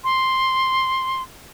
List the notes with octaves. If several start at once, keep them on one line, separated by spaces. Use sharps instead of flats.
C6